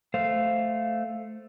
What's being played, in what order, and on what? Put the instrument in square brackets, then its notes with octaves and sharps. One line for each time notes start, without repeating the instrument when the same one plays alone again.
[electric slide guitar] A3 C5 F5